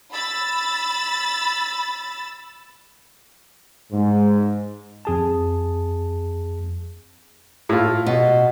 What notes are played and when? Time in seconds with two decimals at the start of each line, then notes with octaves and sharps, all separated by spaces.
0.12 B5 E6 A6
3.92 G#2
5.05 F2 G#4 A5
7.69 A2 F4
8.06 B2